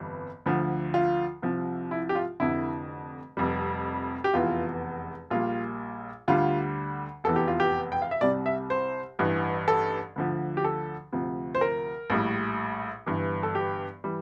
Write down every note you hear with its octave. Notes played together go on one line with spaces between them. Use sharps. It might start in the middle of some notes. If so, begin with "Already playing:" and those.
Already playing: G1 F2 E3 G3
D2 D3 F3
F4
C2 C3 F3
E4
G4
F4
F1 F2 D3 E4
F1 F2 C3 G3
G4
F1 E2 E3 F4
A#1 A#2 G3 F4
D2 D3 G3 F4
F1 E2 E3 A4
G4
F4
G4
G5
F5
E5
C2 C3 G3 D5
E5
C5
A1 G2 E3
A4
D2 D3 F3
G4
A4
D2 C3 F3
C5
A#4
A#1 A2 G3
G1 G2 E3
A4
G4
E3 G3